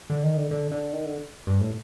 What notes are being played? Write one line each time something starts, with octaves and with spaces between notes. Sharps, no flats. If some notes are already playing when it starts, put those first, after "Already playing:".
D3
D#3
D3
D3
D3
D#3
D3
G2
A2